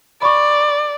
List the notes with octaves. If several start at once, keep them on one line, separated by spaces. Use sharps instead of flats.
D5 B5 C#6